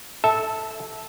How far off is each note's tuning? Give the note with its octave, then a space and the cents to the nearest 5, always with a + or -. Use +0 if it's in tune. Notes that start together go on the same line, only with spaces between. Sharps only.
A4 +0 E5 -15 A5 +0